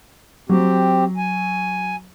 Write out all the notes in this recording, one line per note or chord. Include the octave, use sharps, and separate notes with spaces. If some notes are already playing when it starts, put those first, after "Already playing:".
F#3 C4 G4
G#5